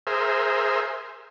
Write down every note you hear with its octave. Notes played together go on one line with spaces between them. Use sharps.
G#4 A#4 C5 E5